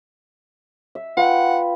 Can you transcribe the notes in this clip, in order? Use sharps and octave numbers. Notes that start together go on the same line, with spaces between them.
E5
F4 B4 F#5 G5